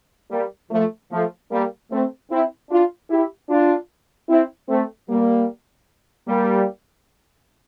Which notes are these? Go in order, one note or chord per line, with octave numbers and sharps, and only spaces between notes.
G3 A#3
F3 A3
F3 A3
G3 A#3
A3 C4
C4 E4
D4 F4
E4 G4
D4 F4
C4 E4
A3 C4
G3 A#3
G3 A#3